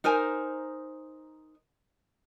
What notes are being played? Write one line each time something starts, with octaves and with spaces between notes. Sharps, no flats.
D#4 A#4 C5 G#5